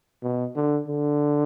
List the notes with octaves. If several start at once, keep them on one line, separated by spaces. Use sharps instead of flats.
B2
D3
D3